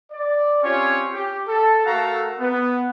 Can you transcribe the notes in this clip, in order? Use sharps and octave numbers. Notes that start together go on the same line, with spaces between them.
D5
C4 C#4 F4 G4 C#5
G4
A4
A3 F#4 A4 A#4 F5 A#5
B3